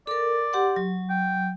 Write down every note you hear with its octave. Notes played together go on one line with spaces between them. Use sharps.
A4 A#4 D5
G4 F#5 C6
F#3
G5